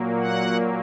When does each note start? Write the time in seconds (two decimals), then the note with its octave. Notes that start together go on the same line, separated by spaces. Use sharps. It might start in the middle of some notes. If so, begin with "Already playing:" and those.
Already playing: A#2 F#3 A#3
0.18 F#5